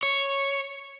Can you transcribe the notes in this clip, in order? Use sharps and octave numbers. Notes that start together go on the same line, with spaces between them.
C#5